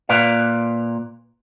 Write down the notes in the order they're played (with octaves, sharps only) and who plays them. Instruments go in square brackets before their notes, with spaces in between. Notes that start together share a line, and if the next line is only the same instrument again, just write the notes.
[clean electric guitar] A#2 B4 D5 F5